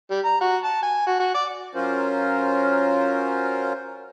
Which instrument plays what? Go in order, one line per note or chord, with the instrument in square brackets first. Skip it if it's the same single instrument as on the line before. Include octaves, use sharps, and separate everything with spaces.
[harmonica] G3
A#5
F#4
A5
G#5
F#4
F#4
D5
[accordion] F#3 C#4 F4 A#4 C5